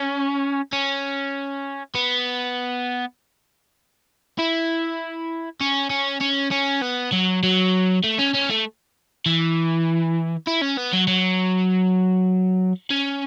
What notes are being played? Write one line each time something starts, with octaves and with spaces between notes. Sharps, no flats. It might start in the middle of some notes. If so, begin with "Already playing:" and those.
Already playing: C#4
C#4
B3
E4
C#4
C#4
C#4
C#4
B3
F#3
F#3
A3
C#4
C#4
A3
E3
E4
C#4
B3
F#3
F#3
C#4